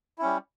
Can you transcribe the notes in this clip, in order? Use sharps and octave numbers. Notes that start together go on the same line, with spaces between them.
G3 C#4 E4